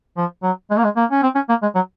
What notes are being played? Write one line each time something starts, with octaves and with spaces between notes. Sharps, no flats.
F3
F#3
G#3
A#3
G#3
A#3
C#4
C4
C#4
A#3
G#3
F#3